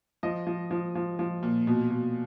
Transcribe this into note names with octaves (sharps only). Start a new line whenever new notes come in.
F3 D#5
F3
F3
F3
F3
A#2
B2
B2